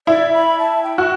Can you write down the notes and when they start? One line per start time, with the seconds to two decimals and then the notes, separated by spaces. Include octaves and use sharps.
0.07 E4 D5
0.33 B5
0.59 A5
0.83 G5
0.98 F#4